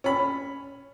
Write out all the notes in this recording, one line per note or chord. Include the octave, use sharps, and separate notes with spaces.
C#4 B5